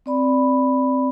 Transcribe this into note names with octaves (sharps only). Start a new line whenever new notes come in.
C4 D5 B5